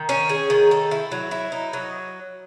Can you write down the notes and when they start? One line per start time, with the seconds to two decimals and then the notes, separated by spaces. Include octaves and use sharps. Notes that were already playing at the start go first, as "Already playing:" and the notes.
Already playing: D#3
0.09 C#4
0.29 G#4
0.50 D#3
0.71 A4
0.91 E4
1.12 F#3
1.31 E4
1.52 D#4
1.73 F#3